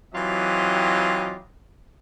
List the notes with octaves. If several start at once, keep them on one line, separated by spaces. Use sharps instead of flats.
E3 F#3 C4 F4 G4 D#5